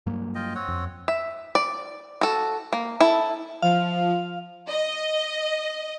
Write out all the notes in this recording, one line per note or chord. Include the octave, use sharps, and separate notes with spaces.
G2 F#3 A#3
F4 D#5 G5
C4 C#5 F#5
F2
E5
D5
F#4 A4
A#3
E4 A4
F3 F5
D#5